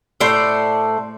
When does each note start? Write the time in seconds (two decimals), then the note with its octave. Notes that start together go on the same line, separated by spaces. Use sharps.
0.20 A2 A3 C5 D5